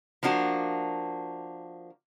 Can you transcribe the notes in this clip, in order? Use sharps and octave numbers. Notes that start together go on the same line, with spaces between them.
F3 A#3 D4 F#4